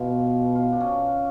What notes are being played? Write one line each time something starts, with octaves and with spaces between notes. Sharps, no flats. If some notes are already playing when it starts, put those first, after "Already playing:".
Already playing: B2 F4
F4
D4
C#4